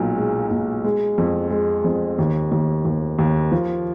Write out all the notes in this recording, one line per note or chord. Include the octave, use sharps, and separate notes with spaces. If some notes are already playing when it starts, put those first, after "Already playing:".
Already playing: B1 A#2
G#3
A#2
G#3
F2
G#3
F2
D#2
D#2
D#2
D#2
F3